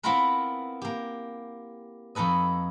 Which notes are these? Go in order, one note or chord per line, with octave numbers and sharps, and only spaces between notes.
B3 C4 E4 F4 A#4 B4
A#3 G4
F2 D#4 A4 B4 D#5